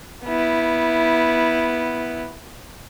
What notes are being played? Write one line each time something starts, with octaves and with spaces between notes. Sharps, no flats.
B3 E4